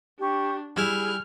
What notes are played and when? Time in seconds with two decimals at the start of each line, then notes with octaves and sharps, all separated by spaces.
0.20 D4 G4 C#6
0.76 G3 E4 G#4 F6